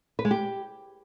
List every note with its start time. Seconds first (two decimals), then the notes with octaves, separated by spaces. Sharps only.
0.19 B4
0.25 G#3
0.31 G4